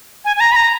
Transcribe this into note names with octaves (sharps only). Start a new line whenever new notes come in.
G#5
G#5
A#5
B5
A#5